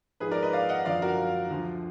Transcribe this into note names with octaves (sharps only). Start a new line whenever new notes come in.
G#2 F3 G#4 B4
A#4 D5
B4 D#5
D5 F5
D#5 F#5
F#2 D3 F3 D5 F5
F#4 A#4
D2 D3 F3